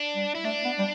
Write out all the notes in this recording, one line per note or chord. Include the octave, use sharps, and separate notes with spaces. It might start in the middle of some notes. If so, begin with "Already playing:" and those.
Already playing: D4
G3
E4
A3 D4
B3
G3